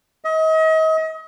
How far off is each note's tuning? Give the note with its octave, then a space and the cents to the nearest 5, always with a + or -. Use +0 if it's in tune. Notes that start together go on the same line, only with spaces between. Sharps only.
D#5 +35